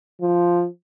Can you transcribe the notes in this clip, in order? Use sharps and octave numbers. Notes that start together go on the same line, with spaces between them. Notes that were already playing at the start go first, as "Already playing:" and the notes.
F3